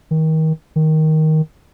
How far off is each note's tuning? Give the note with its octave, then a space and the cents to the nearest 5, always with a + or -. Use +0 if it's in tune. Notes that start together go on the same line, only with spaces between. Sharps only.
D#3 +30
D#3 +10